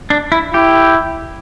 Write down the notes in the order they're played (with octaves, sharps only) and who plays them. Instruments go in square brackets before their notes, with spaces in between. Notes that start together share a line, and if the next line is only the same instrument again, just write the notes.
[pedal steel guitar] D4
E4
[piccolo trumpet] E4 [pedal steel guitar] G4